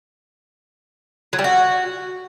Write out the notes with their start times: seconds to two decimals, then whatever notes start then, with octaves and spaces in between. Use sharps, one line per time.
1.33 F#3
1.39 G3
1.44 F#4